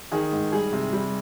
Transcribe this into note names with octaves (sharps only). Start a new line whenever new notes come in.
D#3 G#4
G#2
G3 G#4
C3
G3